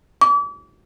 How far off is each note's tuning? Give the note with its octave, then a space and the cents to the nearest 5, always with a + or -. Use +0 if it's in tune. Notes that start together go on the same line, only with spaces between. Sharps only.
D6 -40